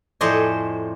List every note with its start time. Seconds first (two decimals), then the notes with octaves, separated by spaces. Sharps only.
0.21 F2 A2 C5 D5 D#5 G#5